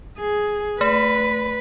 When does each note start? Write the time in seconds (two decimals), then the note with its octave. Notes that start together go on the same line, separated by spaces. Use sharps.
0.19 G#4
0.81 A3 B4